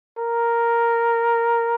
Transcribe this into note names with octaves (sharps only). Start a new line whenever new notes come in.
A#4